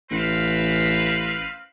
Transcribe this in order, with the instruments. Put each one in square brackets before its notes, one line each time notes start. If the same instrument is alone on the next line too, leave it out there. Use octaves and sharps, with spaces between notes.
[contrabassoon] A1 [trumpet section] C4 B4 F5